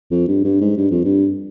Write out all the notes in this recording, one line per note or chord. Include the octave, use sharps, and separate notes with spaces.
F2
G2
G2
G#2
G2
F2
G2